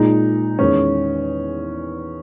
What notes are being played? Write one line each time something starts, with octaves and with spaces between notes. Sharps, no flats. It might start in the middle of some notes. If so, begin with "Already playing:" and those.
Already playing: A#2 G#3 D#4
E2 D#3 G#3 C#4